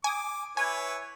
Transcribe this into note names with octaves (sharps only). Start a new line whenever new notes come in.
G#5 D6 D#6
E4 B4 C#5 G#5